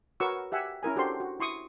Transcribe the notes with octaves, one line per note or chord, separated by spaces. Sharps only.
F#4 A#4 B4 C#5 C#6 E6
G4 E5 F#5 G#5
C#4 E4 A#4 G#5
D4 F#4 G4 A4 C5 C6
F#4
E4 C6 C#6 D#6